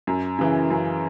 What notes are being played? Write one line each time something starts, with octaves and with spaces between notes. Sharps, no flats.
F#2
C#3 E3
F#2